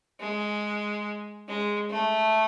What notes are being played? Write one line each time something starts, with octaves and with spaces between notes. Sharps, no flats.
G#3
G#3
A3